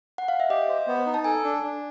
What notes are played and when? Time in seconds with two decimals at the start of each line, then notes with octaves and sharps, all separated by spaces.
0.18 F#5
0.28 F5
0.40 E5
0.50 G4 D#5
0.68 C5
0.88 B3
1.06 D#4
1.14 A5
1.24 A4 G#5
1.44 D4
1.62 D4